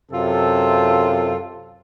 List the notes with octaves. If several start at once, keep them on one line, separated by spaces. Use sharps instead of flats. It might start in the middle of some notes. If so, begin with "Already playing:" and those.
F#2 C3 F4 A4